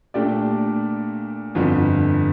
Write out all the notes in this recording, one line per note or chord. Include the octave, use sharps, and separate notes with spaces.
A#2 A3 D4 G4 D5
G1 F2 D3